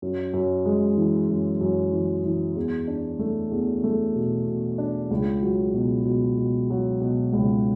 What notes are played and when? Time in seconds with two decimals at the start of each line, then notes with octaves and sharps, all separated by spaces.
0.02 F#2
0.34 F#2
0.65 G#3
0.97 E3
1.30 F#2
1.61 F#2
1.93 E3
2.24 E3
2.56 E2
2.87 D4
3.19 A3
3.51 E2
3.84 A3
4.15 B2
4.47 B2
4.78 D4
5.11 C#2
5.43 F#3
5.74 B2
6.05 B2
6.38 B2
6.70 F#3
7.01 B2
7.33 C#2